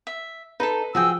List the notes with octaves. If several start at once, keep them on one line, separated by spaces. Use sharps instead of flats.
E5
D#4 A4 B4
F3 F#4 G#4 G5 E6